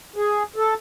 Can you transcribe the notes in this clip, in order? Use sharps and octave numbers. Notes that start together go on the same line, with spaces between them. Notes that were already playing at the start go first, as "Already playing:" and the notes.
G#4
A4